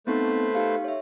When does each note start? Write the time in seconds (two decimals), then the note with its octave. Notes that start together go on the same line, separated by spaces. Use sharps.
0.07 A3 B3 C4 D#4 B4 C5
0.55 D#4 G4 F5
0.84 C#5 E5